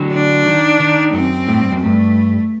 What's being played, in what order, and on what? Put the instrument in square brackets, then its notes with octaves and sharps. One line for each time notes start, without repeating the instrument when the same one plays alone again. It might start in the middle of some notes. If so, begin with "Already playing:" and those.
Already playing: [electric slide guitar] D3 F#3
[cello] D4
[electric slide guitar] D#3
D#3
[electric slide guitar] F#2 [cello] C4
[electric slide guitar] A2
G2
F#2
[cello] A3
[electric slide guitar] G2